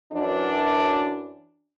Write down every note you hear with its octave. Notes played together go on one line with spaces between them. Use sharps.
F#2 E3 D4